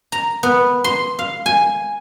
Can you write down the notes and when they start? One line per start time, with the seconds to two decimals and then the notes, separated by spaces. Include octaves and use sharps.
0.12 A#5
0.43 B3
0.84 C6
1.19 F5
1.46 G#5